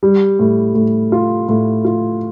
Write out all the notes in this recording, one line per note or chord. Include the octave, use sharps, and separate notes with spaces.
G3
A2
A2
F4
A2
F4